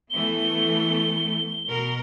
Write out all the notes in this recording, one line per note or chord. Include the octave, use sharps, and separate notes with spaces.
E3 A3 B3 G7
B2 A#4